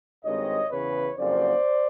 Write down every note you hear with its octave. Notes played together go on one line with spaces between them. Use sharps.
G#1 G2 D#3 G#3 C4 C#5 D#5
E2 C#3 E3 B4 C#5
F#1 F2 C#3 F#3 A#3 C5 D5